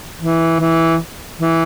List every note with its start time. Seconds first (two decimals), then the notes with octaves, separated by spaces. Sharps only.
0.20 E3
0.60 E3
1.40 E3